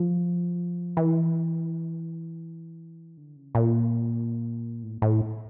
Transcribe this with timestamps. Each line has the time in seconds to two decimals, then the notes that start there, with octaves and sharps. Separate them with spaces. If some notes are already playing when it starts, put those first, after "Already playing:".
Already playing: F3
0.97 E3
3.17 D3
3.36 C#3
3.55 A#2
4.83 A2
5.02 A2